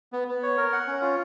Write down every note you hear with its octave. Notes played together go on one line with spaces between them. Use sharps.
B3
B3
C#5
A#4
F#5
C#4
F4